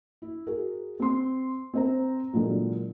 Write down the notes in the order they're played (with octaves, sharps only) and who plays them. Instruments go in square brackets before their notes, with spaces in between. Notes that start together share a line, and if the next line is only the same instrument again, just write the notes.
[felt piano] E4
F#4 G#4 A#4
C4 C6
C4 C5 A#5
A#2 D3 E3 F#3 G#3 A#3